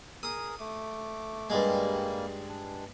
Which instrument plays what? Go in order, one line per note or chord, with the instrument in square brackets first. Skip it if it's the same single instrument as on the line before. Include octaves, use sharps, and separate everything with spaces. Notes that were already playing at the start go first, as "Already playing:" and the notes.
[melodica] G#4 A#4 [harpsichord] D#6
[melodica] A3 D6
[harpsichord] G2 G#3 [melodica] G3 A#3
[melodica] D4